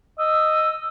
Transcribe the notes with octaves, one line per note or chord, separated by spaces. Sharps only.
D#5 E6